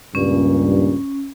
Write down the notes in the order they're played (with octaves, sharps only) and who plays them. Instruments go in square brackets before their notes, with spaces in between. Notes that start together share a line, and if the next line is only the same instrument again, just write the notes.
[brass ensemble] C#2 G2 A#2 [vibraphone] C#4